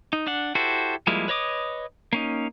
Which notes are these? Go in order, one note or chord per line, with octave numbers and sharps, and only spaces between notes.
D#4
D4 F#5
E4 F#4 G4 A4 C5
F3 G3 G#3 A#3 E4
B4 C#5 D#5 D6 D#6
A#3 C#4 D#4